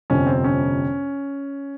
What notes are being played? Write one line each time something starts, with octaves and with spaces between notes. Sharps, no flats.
G1 F2 C3 C#4
C4
C#4